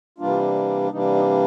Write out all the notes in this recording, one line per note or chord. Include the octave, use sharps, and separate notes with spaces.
C3 E3 G3 A#3 D4 F4
C3 E3 G3 A#3 D4 D#4
D#4